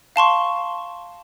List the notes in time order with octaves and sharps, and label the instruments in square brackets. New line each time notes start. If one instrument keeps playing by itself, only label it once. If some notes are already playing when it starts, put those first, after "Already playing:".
[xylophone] F5 A5 C6 C#6